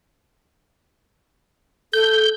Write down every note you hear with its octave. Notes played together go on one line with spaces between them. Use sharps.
A4 G6